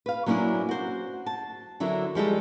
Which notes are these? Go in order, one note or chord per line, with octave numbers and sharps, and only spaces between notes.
B4 F5
F#3 A#3 C#4 D4 E4
F#4 C5
A5
D3 F#3 E4 A#4 E5
F3 G3 G#3 A4